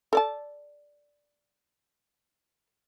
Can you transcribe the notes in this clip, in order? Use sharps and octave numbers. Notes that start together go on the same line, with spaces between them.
A4 D5 A5